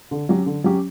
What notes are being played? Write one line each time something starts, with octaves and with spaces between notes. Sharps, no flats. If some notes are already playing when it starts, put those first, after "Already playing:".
D3
F#3 C#4 G4
D3
F#3 C#4 G4